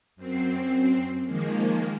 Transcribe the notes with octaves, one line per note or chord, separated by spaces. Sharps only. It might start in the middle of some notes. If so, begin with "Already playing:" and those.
F#2 C4 C7
D#3 F3 G#3 A#3